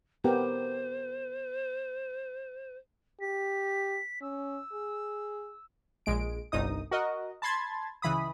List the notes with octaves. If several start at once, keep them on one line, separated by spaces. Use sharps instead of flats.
B3 G4 A#4 C5
G4 B6
C#4 E6
G#4
A#1 G#3 D7
G1 C2 D#4 D#6
F#4 A#4 D#5
A5 B5 C6 G#6 A6
C#2 E3 B5 D#6